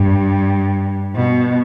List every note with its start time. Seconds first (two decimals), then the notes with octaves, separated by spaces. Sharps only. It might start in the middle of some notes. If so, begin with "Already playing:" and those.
Already playing: G2
1.15 B2